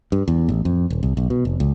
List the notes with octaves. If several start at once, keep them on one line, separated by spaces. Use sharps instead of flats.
G2
E2
A1
F2
D#1
C2
B1
B2
F1
C#2